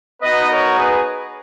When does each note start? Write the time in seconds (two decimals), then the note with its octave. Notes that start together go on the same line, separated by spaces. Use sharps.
0.22 B3 D#4 F#4 B4 D#5
0.51 A#4 C#5
0.78 G#4 B4